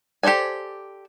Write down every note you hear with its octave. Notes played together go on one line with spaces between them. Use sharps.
G4 A4 C5 D5 G#5